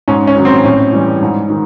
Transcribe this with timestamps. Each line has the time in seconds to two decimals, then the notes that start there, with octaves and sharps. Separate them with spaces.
0.08 G#2 C#4
0.27 C#4
0.36 D#3 F#3
0.45 C4
0.64 A2 C#4
0.93 E3 G3
1.22 G#2
1.50 D#3